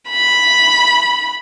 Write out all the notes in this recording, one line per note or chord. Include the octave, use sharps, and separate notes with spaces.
B5